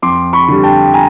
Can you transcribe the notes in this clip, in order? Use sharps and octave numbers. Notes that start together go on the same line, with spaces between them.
F2 C6 D6
B5 C#6
D3 G3
G5 A5
G#5 A#5